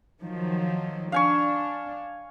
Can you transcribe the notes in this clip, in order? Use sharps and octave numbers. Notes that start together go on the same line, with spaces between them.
D#3 F3 F#3
D4 F5 G#5 C#6